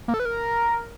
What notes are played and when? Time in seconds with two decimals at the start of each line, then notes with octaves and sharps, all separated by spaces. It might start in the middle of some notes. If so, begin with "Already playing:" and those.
0.08 A#3
0.14 A4
0.20 B4
0.25 A#4